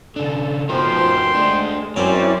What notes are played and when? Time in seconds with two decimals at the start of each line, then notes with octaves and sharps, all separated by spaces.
0.16 C#3 D4 A4
0.69 F3 B3 D#4 F#4 A#4 G5 C6
1.34 G#3 A3 D4
1.96 F#2 F#3 C4 C#4 E4 C5 D5